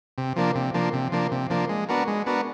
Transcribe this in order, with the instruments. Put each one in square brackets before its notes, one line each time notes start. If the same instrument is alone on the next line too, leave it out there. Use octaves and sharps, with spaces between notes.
[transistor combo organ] C3
F3 A#3 D4
C3
F3 A#3 D4
C3
F3 A#3 D4
C3
F3 A#3 D4
G#3
B3 D4 F#4 A#4
G#3
B3 D4 F#4 A#4